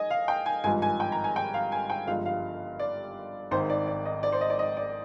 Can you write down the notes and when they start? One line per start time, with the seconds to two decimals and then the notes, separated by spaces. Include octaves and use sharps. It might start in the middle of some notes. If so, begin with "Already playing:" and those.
Already playing: D#5 G#5
0.10 F5
0.28 G5
0.46 G#5
0.64 G#1 G2 F3 G#3 G#5
0.82 G#5
1.00 G5
1.12 A#5
1.24 G#5
1.36 G5
1.54 F5
1.72 G#5
1.90 G5
2.07 G1 G2 F3 G#3 F5
2.26 F5
2.80 D5
3.51 G#1 G#2 D#3 C5
3.70 D5
3.87 D5
4.05 D#5
4.23 D5
4.32 C5
4.41 D#5
4.50 D5
4.59 D#5
4.77 D5